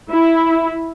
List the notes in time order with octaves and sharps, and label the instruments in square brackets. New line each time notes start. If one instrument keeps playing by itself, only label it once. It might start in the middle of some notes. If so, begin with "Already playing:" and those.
[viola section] E4